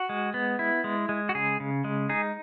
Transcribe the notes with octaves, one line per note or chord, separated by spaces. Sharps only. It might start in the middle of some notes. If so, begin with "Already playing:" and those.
Already playing: F#4
G#3
B3
E4
G#3
G#3
F#4
C#3 G#4
C#3
G#3
D#4 G#4